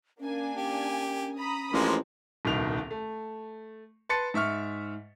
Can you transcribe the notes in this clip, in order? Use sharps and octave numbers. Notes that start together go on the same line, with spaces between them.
A#3 C#4 D4 G#5
C#4 G4
A#5 B5 D#6
A1 F3 G#3 A#3 C4
D#1 C2 B2 D#3 F7
A3
B4 A5 C6 A6 C#7
G#2 E5 C#6 F6